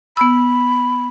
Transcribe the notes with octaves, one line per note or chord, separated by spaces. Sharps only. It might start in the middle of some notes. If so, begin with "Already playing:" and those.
B3 B5 E6